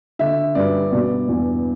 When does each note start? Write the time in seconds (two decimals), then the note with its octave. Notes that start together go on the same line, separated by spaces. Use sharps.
0.19 D3 E5
0.55 G2 D5
0.92 B2 D5
1.28 E2